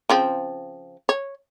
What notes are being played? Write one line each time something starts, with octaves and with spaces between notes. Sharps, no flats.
C#3 F3 C4
C#5